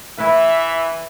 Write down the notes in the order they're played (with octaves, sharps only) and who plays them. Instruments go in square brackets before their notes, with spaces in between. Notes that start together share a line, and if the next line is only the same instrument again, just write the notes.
[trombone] E3 [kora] E4 B4 [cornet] E5